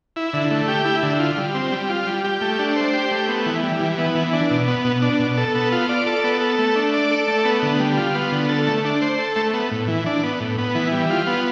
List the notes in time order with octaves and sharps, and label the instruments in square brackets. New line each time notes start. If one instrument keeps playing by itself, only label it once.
[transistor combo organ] E4
D3
A3
G4
E4
D3
F4
G3
C4
G3
F4
G3
G4
A3
D4
C5
G4
A3
B3
E3
G3
E3
B3
E3
D4
B2
B3
B2
D4
B2
A4
B3
F4
D5
A4
B3
A4
A3
D4
D5
A4
A3
B3
D3
G3
F4
B3
D3
A4
A3
D4
C5
A4
A3
B3
A2
E3
D4
B3
A2
B3
E3
G3
F4
B3